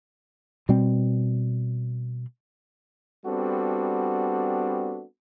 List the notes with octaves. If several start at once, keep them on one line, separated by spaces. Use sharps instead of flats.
B2 G3 C4
G3 B3 C4 D4 F#4 A4